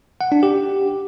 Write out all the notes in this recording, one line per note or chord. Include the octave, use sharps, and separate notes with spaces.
F#5
D4
G4